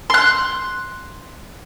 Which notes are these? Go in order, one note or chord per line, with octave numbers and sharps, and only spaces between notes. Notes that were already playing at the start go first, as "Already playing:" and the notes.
C6 F#6